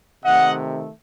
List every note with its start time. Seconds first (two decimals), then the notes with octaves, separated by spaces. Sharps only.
0.25 C3 D#3 A3 D#5 F#5